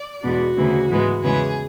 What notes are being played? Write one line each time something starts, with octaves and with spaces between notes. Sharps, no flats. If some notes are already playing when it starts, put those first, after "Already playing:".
Already playing: D5
E2 B2 G#3 B3 D4 F#4
D2 C#3 E3 B3
G#2 E3 G#3 B3
E2 C#3 E3 G#3 B3 G#4